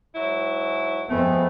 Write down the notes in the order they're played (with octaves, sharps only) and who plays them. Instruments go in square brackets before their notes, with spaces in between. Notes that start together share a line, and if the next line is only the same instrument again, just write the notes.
[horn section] G#2 F#3 E4
[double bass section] F2 B3 C4 [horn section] G#3 A3